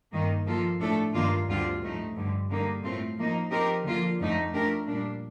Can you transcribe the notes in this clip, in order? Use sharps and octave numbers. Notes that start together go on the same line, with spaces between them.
G2 D#3 A#3 D#4
F3 A#3 F4 A4
A2 A3 D4 A4
G2 D#3 A#3 D4 F4
D2 D3 G3 C4 F4
A2 F3 A3 D#4
G2 D3 G3
D3 G3 A#3 D#4
A2 A3 C4 F4
F3 A#3 D#4
F3 C4 D#4 G4 A#4
D3 F3 A#3 F4
F2 D3 F3 A3 D#4
F3 A3 D4 G4 A#4
A#2 G3 A#3 D4